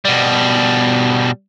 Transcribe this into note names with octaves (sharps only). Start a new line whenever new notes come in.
B2 G3